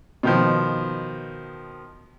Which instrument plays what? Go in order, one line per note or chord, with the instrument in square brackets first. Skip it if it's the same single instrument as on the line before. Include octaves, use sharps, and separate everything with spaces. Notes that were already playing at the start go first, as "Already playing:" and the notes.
[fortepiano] B2 D#3 F3